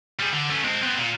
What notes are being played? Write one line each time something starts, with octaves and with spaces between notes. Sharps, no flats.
G3 G#4
D3
A3 C#4
G#3 C4
B3 C4
A#2